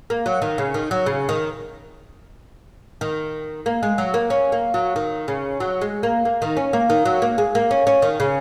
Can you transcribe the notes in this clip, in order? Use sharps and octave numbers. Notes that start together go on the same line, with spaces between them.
A#3
F#3
D#3
C#3
D#3
F#3
C#3
D#3
D#3
A#3
G#3
F#3
A#3
C#4
A#3
F#3
D#3
C#3
F#3
G#3
A#3
A#3
D#3
C#4
A#3
D#3
F#3
A#3
G#3
A#3
C#4
C#4
D#3
C#3